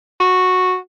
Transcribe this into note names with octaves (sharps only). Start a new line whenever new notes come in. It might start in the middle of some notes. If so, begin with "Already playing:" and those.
F#4